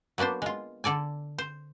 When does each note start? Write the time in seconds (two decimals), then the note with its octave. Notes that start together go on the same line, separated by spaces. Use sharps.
0.18 F#3 A#3 B3 D4 C5
0.42 G#3 F4
0.84 D3 A4 D5 G#5
1.38 C5